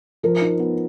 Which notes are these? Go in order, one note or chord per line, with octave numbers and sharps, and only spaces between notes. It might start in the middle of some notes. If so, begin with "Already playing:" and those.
F3 A#4
D#4
B3